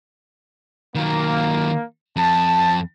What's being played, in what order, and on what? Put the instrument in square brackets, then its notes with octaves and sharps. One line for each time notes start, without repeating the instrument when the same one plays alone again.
[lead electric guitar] D#3 F#3 [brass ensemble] A#3
[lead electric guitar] F2 [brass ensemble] A5